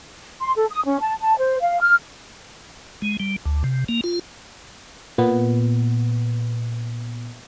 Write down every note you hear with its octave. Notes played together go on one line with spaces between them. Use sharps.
C6
A4
D#6
C#4
A5
A5
C5
F5
F6
G#3
G3
D2
C3
A#3
F4
A#2 B3